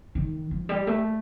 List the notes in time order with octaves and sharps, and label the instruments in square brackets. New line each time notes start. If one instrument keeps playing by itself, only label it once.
[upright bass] D#3
F3
G3
A3